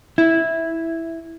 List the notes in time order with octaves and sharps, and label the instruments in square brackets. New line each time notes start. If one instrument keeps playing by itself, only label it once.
[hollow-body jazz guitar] E4